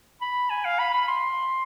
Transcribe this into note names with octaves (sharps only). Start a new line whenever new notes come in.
B5
G#5
F5
B5
B5
C6